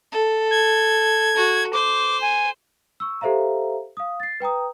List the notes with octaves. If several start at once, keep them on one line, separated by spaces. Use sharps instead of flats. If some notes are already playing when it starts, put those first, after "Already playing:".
A4
G#6
F#4
C5 D6
G#5
C#6 E6
G4 A4 C5 E5 F5 A#5
F5 D#6
A6 C7
B4 G5 A#5 D#6